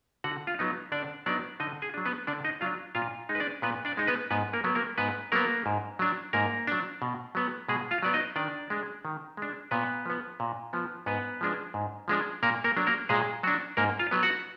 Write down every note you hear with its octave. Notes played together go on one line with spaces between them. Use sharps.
D3 F#4 F#5
F4 F5
F#3 B3 D#4
D3 D4 D5
F#3 B3 D4 D#4 D5
D3 D#4 D#5
G#4 G#5
F#3 D4
B3 B4
D3 D4 D5
D#4 D#5
F#3 D4 F4 F5
A#2 F4 F5
G#3 D#4
B4
D4 D5
A#2 B3 B4
D4 D5
G#3 D#4
B3 B4
G#2 B3 B4
A#3 A#4
F#3 B3
A#3 A#4
G#2 B3 B4
F#3 A#3 B3 A#4
G#2
F#3 D4
G#2 A#3 A#4
F#3 D4
B2
F#3 B3
B2 G#3 G#4
F4 F5
F#3 B3 D5
D#4 D#5
D#3 D4 D5
G#3 D4
D#3
G#3 D4
A#2 B3 B4
F3 B3
A#2
F3 B3
G#2 B3 B4
F3 G#3 D4
G#2
F3 G#3 D4
A#2 A#3 A#4
A#3 A#4
F#3 D4
A#3 A#4
A#2 G#3 G#4
F#3 D4 F#4
G#2 A#3 A#4
F4 F5
F#3 B3
F#4 F#5